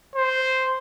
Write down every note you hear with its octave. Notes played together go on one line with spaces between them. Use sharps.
C5